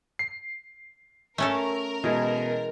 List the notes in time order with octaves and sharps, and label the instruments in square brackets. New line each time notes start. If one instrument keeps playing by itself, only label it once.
[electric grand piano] C7
[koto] A3 C#4 A4 [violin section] A#4
[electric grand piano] B2 [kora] E3 G#3